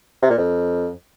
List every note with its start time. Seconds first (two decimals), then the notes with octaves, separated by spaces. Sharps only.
0.22 C3
0.30 A#2
0.38 F2